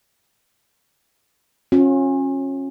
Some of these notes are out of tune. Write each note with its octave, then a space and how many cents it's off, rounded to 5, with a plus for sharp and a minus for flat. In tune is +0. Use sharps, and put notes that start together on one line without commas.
C#4 -25 F4 +45